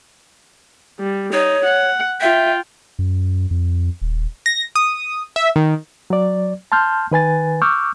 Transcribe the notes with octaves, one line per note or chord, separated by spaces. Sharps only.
G3
D#4 C#5
F#5
F4 E5 G5
F#2
F2
D#1
A#6
D#6
E5
D#3
F#3 D5
A5 C6 F6 G6
D#3 B4 G#5 A6
C#6 D6 E6 F6 G6